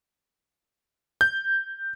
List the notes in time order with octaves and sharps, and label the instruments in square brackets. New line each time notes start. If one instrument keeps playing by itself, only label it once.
[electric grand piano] G6